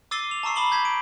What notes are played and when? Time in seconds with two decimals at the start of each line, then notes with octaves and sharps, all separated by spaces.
0.11 D6 E6 A6 C7 D#7 G7
0.31 F7
0.43 A5 A#5 C#6 E6 C7
0.56 A5 B5 D6 D#6 F#7 G7
0.71 A5 G6 G#6 B6
0.85 D7